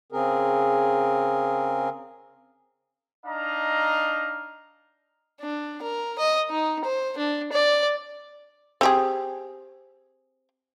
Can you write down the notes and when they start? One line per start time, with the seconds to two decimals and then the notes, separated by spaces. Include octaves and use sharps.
0.12 C#3 C4 G#4 A#4
3.26 D4 D#4 D#5 F5 A#5
5.41 D4
5.82 A#4
6.19 D#5
6.50 D#4
6.84 C5
7.17 D4
7.52 D5
8.81 C4 G4 G#4